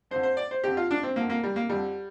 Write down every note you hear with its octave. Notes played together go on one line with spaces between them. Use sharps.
F2 D3 C5
C5
D5
C5
F2 D3 G4
F4
D4
C4
F2 D3 A#3
A#3
G3
A#3
F2 D3 G3